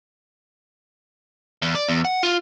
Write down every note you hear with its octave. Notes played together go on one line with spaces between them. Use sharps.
E2
D5
E2
F#5
F4